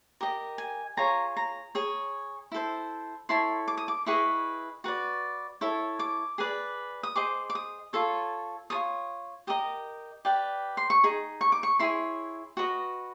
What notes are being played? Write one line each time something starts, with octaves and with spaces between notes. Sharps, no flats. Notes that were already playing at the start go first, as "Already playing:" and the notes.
G4 A#4 D#5
G#5
F4 G#4 C#5 A#5
A#5
G#4 C#5
E4 A4 C5
E4 A4 C#5 C6
D6
D#6
D6
E4 G#4 B4 D#5 C#6
F#4 B4 D5
E4 A4 C#5
D6
G#4 B4 D5
D#6
G#4 C5 D#5 D6
D6
D#6
F4 A4 C#5
F4 A4 C#5 D#6
G4 A#4 D#5 D#6
G4 B4 D5
C6
C#6
D#4 G#4
C#6
D6
C#6
E4 G#4 C#5 C6
F#4 B4 D#5